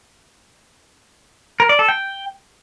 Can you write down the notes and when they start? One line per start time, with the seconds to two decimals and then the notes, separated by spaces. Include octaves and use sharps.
1.60 A#4
1.69 D5
1.79 A4
1.89 G5